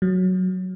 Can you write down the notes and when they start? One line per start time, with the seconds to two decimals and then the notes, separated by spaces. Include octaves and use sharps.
0.02 F#3